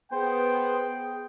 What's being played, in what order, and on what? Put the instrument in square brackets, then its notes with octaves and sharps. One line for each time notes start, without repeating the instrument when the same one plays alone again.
[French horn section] B3 [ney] G#4 [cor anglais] C5 [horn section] G5